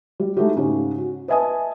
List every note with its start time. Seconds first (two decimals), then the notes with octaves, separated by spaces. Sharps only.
0.20 G3
0.37 G#3 A3 D#4 E4 F#4 G4
0.56 G#2 C#3 C#4 G4
0.98 F#4
1.28 B4 D#5 E5 G#5 A5 D#6